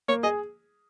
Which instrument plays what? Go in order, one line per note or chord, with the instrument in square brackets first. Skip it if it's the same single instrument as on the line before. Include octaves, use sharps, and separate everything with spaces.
[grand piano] A#3 [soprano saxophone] C#5
[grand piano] G#4 [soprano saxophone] D#5